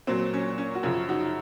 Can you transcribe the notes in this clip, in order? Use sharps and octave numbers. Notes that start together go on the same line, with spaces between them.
A#2 F#3 C4
C#4
C#4
F#4
F#2 C#3 F3 C#4 F4
D#4 F#4